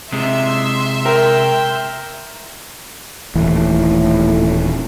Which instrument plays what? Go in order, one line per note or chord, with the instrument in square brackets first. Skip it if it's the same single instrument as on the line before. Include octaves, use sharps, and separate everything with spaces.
[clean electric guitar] C3 G#3 [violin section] E5 C6
[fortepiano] A#4 [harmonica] G5
[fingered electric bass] D#1 E3 [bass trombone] A2